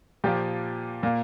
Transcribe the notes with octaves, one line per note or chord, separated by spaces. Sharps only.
A#2 F3 A#3 G4
A#2 A#3